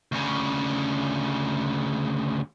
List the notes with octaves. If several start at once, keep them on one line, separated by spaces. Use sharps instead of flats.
D2 C#3